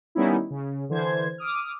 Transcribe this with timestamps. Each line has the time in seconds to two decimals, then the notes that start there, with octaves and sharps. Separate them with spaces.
0.15 D#3 G3 B3 C#4 D#4 E4
0.50 C#3
0.89 D3 E3 C5 G#6
1.38 D6 D#6 F6